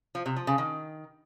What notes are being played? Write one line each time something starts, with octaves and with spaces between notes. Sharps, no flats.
F3
C3
F3
C#3
D#3